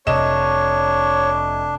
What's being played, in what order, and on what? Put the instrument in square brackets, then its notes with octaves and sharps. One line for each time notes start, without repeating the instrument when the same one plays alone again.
[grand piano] F1 D#5 E7 [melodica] D4 [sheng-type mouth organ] C#5